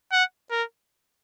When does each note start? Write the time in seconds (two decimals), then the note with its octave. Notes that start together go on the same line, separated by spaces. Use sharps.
0.12 F#5
0.51 A#4